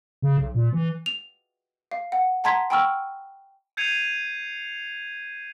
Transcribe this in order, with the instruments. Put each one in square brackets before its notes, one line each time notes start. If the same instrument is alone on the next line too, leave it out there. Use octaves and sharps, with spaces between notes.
[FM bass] C#3
B1
A#2
E3
[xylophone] F7
F5
F#5
F#5 A5 A#5 C6 G#6 B6
G5 G#5 B5 C#6 E6 F6
[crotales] G6 G#6 C7 C#7 D#7 F7